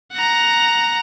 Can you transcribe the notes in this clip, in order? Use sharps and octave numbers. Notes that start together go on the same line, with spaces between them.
F#5 A#5